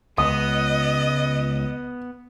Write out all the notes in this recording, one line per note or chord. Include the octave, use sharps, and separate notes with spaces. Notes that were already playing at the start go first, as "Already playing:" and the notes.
C#2 B3 D#5 D#6